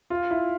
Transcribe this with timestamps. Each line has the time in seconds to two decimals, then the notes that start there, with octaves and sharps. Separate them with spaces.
0.10 F4
0.31 E4